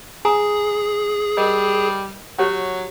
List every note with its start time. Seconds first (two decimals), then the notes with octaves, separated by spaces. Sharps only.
0.25 G#4 G#5 A#5 D#6
1.37 G3 A#4 D#5
2.39 F#3 G4 C#5 F#5